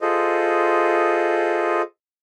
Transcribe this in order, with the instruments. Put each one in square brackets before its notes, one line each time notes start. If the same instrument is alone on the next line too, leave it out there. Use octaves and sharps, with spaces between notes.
[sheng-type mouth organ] F4 G#4 A4 C5 D#5